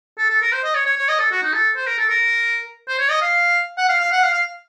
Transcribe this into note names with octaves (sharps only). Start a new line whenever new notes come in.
A4
A4
A#4
C5
D#5
C#5
C#5
C#5
D#5
A4
F#4
D#4
A4
C5
A#4
A4
A#4
C5
C#5
D#5
F5
F#5
F5
F5
F#5
F5
F5